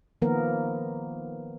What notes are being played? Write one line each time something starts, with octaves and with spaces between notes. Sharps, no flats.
D#3 F3 A#3 B3 A#4